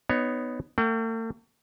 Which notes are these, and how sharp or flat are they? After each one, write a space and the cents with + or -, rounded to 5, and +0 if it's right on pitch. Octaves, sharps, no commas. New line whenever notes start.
B3 +10 D#4 -15 C#5 +0
A3 +45 F#5 +45